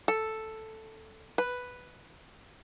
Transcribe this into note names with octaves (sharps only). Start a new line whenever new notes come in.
A4
B4